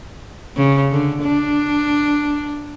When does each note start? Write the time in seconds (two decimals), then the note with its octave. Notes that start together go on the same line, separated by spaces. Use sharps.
0.57 C#3
0.92 D3
1.22 D4